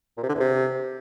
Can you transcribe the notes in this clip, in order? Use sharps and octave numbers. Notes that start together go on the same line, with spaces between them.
A#2
C3
D3
E2
C3